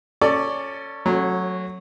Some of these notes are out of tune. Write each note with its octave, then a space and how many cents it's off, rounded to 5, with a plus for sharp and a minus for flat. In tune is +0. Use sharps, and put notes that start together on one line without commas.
C#4 +0 A4 +25 D5 +0
F#3 -5 A3 +0 C#4 -35